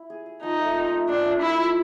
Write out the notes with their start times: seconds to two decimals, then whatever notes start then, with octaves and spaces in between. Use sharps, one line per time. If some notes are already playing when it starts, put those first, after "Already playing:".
Already playing: E4
0.10 G#4
0.26 G#4
0.43 F3 D#4
0.59 A3
0.75 C4
0.92 A3
1.09 C4 D4
1.25 F3
1.41 F3 E4
1.58 A3